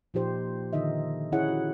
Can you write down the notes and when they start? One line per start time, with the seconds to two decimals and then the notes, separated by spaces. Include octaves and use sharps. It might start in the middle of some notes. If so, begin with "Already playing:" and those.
0.14 A#2 F3 D#4 G4 C5
0.73 D3 D#3 D#4 D#5 E5
1.32 C#4 E4 G#4 C#5 F#5
1.48 F#4